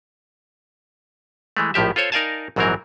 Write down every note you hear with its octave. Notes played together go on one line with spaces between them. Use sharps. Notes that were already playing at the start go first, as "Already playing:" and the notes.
E3 G#3 A3
A#1 A2 F3 G4 E5
F4 A4 C5 C#5
D#4 A#4 D5 F5 G#5 A5
A#1 G#2 E3 F#3 C4 A#4